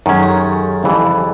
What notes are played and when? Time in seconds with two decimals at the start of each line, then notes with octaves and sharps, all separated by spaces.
0.06 F#2 D#3 G#3 C#4 A4
0.14 G#4
0.23 G4
0.32 G#4
0.44 A4
0.83 F2 C#3 E3 G3 A4